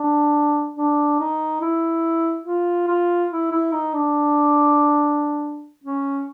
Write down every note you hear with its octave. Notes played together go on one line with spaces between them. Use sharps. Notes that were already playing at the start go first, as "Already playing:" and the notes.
Already playing: D4
D4
D#4
E4
F4
F4
E4
E4
D#4
D4
C#4